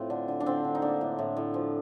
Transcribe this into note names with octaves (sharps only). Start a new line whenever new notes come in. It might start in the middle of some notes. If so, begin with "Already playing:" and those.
Already playing: A2 C4 F4
D3 D4
D3
D4
D3 C4
D3
D#4
A#3 D4
A2
A2
A2
F3